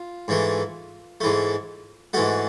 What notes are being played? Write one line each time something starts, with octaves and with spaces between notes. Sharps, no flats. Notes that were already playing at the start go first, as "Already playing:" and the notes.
Already playing: F4
G#2 E3 A3
G#2 E3 A3
G#2 E3 A3 F#4